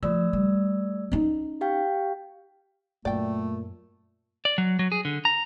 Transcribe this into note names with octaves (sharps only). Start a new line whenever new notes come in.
F3 A3 D5 E6
G3
C#4 D#4
G4 F5 G5
F#2 A#2 A3 D5 G5
D5
F#3
F#3
G#4
D3
A#5